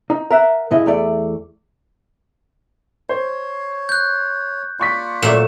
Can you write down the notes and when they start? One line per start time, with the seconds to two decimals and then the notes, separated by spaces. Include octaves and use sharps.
0.10 D#4
0.31 A#4 E5 F#5
0.71 G2 C#3 E4 D#5
0.86 E2 A3 D5
3.09 C5 C#5
3.89 F#6 G6
4.80 A#3 F4 D5 C6 C#6 B6
5.22 A#2 F#3 A3 E7